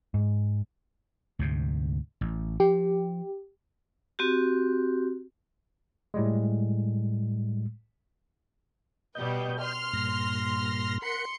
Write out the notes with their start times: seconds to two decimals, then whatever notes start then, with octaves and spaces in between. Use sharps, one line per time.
0.14 G#2
1.39 D2 G#2 C3
2.21 A1
2.60 F3 G4
4.19 C4 F#4 G4
6.14 A2 G3 G#3
9.15 B2 G3 B4 D#5 G6
9.61 C6 F6
9.93 G2 A#2 A#6
11.02 A#4 F#5 B5 C6 C#7